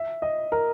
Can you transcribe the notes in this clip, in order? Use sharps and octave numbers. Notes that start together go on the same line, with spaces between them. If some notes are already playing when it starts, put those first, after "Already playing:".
Already playing: E5
D#5
A#4